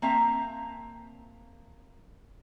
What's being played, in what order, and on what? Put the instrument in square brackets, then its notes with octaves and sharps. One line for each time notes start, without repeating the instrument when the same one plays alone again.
[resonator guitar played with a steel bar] A#3 C4 E5 A5 A#5